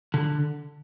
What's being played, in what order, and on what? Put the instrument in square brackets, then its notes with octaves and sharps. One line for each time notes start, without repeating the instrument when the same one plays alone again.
[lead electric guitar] D3